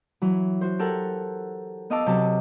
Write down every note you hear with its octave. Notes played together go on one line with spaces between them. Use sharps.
E3 F#3
F#4 C5
G4 A4 A#4 F#5 A5
B3 D#5 F5 A5 D6 E6
C3 F#3 A5